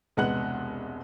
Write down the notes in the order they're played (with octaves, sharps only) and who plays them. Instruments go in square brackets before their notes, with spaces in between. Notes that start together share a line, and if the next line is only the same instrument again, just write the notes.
[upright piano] E1 C2 G#3 B3 F#5 F#6